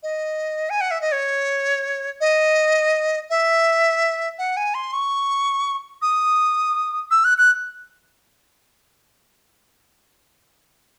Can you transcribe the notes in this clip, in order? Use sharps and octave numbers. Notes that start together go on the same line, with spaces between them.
D#5
G#5
F#5
E5
D#5
C#5
D#5
E5
F#5
G#5
C6
C#6
D#6
E6
F#6
F#6